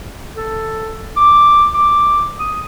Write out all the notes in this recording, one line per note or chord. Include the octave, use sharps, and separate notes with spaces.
A4
D6
D6
D#6